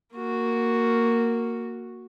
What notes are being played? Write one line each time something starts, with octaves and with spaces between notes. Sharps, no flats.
A#3 F#4